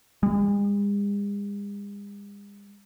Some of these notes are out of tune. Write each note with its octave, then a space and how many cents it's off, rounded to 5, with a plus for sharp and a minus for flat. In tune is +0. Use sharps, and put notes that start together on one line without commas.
G#3 -45